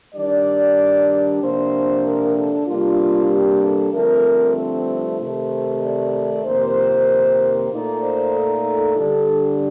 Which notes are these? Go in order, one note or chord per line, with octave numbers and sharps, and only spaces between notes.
D#3 G3 D4 D5
C3 F3 A#3 D4 C5
A#4
A4
C3 G3 A#3 D4 F4
G4
A4
G2 D3 F3 A3 C4 A#4
C5
C3 D#3 A3
D5
F2 C3 D#3 A#3 C5
A#2 A3 D#4 D5
C5
A4
D3 G3 D4